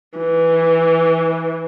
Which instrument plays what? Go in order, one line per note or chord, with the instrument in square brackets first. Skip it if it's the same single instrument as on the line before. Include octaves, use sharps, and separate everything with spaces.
[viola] E3